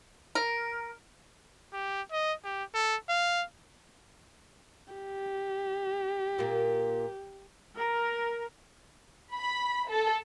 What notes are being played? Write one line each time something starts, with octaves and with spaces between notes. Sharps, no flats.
A#4
G4
D#5
G4
A4
F5
G4
A#2 A#3
A#4
B5
A4